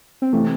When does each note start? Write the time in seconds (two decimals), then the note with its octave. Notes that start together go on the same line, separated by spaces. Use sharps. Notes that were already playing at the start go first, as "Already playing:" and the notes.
0.22 C4
0.33 C3 E3 A3 C4